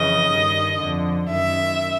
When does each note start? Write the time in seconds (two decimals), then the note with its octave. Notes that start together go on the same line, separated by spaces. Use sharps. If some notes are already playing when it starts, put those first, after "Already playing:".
Already playing: F2 C#3 E3 D#5
0.29 G2 D#3
0.79 F2 D3
1.29 F#2 D#3 E5